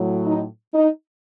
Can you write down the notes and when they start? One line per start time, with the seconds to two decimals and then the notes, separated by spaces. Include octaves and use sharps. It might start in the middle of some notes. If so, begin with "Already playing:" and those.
Already playing: A2 F#3
0.26 D#4
0.74 D#4